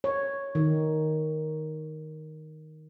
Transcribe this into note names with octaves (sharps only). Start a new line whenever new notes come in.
C#5
D#3